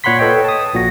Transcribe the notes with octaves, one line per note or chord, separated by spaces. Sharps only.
A#2 C#5 F#5 B5 C6 B6
A4 B4 C#5 D#5 G5
A5 D#6
A#1 A#2 F#4 A#6